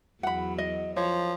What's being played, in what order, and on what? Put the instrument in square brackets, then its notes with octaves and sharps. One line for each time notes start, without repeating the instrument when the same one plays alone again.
[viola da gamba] E2 F#3 [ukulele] F#5 B5
[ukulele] D#5
[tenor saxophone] F3 [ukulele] C#5